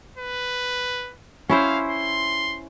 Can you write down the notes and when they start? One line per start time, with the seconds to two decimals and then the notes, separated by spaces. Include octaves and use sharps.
0.17 B4
1.49 C#4 E4 C5 F5
1.89 C6